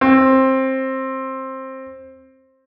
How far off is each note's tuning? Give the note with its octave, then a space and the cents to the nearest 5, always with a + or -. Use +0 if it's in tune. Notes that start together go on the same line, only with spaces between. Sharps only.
C4 +15